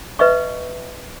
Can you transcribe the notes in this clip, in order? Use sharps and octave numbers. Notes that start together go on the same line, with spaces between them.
B4 D#5 E5 C#6